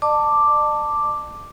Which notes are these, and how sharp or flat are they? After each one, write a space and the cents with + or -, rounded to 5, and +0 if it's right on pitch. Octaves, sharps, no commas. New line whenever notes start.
D5 +45 A5 +15 D6 +0